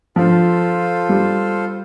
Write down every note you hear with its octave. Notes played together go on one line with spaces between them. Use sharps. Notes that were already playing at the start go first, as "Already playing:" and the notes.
F3 F4 A4 C5
G3